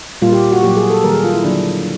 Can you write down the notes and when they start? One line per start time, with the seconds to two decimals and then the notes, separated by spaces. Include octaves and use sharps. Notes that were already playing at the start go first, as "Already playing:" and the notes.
0.22 A#2 G3 A#3 F4
0.32 G4
0.52 F#4
0.63 A#2 F#3 A#3 G4
0.77 G#4
0.90 A4
1.03 D#3 G3 A#3 A#4
1.14 G#4
1.24 F4
1.34 E4
1.44 D3 F#3 A#3 D4